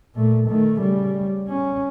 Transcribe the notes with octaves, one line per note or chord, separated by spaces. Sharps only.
A#2 A3
D#3 A3
C#3 G3
C#4